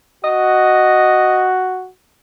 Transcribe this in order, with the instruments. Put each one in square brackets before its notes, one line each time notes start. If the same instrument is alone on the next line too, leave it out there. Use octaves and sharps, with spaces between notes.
[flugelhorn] F#4 [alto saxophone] D#5